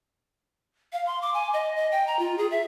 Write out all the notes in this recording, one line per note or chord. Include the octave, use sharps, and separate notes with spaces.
F5
C6
D6
G#5
D#5
D#5
G5
A#5
F4
G#4
E5